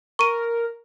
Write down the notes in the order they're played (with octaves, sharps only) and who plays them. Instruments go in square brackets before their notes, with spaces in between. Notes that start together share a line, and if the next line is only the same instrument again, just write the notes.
[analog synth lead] A#4 [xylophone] C#6 D#7